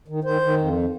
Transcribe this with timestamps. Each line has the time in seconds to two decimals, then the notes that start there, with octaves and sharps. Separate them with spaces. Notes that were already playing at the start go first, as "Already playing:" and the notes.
0.08 D#3
0.24 D#3 C5
0.41 D#3
0.58 F2